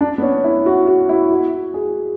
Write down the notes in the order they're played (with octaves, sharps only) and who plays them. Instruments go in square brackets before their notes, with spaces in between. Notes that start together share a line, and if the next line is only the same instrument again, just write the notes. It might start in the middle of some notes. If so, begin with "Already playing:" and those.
[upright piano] D4
B3
C#4
E4
F#4
F#4
E4
F#4
G#4